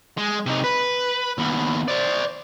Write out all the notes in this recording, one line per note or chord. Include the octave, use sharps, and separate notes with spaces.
G#3
C3 D#4
B4
D#2 B3
C5 D5